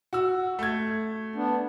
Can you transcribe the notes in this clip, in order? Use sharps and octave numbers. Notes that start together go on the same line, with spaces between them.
F#4 E6
A3 G#6
B3 D4